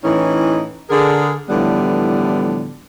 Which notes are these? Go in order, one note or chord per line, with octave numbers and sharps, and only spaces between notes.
A2 E3 C#4 D#4 E4
D3 G#4 A#4
A2 D3 E3 F3 G3 B3